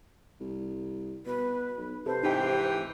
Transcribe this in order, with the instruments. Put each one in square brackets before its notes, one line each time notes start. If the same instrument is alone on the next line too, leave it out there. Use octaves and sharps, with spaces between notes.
[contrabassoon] C2
[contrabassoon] B2 [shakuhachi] B4
[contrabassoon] B1
[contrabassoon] C3 [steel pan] A4 B4 [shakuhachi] C5
[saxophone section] G#2 E3 G4 [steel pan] D#4 G5
[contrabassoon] F1